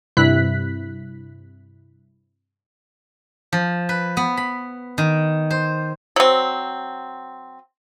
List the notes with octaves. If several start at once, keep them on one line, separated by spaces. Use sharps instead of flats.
G2 C3 E4 F#6 B6
F3
B4
B3
B5
D#3
C5
F#3 C4